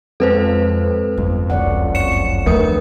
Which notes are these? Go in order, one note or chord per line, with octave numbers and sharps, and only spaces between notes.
F2 G#3 C4 F4 A4 B4 C5
G1 F2
F#1 C#2 C#5 D5 F#5
C#5 C#7 E7
D#2 F3 A3 A#3 A#4 B4 D#6